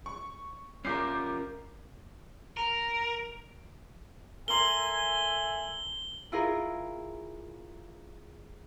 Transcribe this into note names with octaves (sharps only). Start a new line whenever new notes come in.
C#6
C#4 F4 A#4 D6 G6 C7
A#4
A4 A#4 E5 G#5 A#5 C6 F#7 G7
E4 F4 G#4 A#4